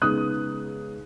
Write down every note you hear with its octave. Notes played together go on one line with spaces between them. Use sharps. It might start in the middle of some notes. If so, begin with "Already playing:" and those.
C#3 G#3 B3 D#4 D#6 F#6